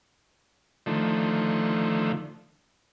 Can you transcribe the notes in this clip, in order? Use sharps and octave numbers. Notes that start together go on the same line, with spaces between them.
D3 D#3 F3 A3